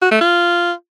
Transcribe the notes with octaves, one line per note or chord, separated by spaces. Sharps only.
F#4
A3
F4